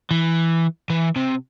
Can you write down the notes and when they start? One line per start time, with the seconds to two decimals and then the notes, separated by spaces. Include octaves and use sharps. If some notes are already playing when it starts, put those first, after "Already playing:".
0.11 E3
0.90 E3
1.16 C3